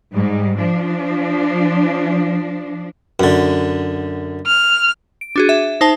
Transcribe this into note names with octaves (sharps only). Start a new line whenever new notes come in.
G#2 G3
F3 D4
F#2 D3
F6
D7
D4 F#4 G#4
E5
D#4 C5 A5